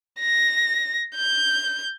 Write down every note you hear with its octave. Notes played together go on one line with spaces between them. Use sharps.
A#6
G6